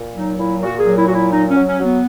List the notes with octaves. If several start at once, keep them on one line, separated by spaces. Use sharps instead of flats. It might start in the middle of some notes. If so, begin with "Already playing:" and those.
Already playing: A#2
F#3 D#4
A#2 E4
A#2 F#4
G#4
F#3
E4
A#2 F#4
E4
F#3 D#4
C#4
F#3
C#4
F#3
B3